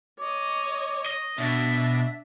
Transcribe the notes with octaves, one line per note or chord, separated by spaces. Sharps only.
C#5 D#5 D6
D#5
B2 D4 E5